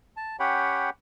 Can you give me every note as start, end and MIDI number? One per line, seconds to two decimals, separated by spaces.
0.17 0.36 81
0.40 0.90 61
0.40 0.90 67
0.40 0.90 73
0.40 0.90 78
0.40 0.90 79
0.40 0.90 83